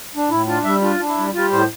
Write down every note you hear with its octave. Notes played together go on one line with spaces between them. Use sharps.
D4
A2 E4
D4 F4
G3 E5
D4 F4
D4
E4
G3
G3 F4
A2 C5